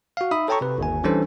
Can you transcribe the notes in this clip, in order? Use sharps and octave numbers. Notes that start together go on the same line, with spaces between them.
F#4 F5
D#4 E5 B5 D#6
A4 C#5 G5 A5 A#5 C#6
C3 B4
G1 D#2 G#5
E3 G3 C#4 D4 A4 C5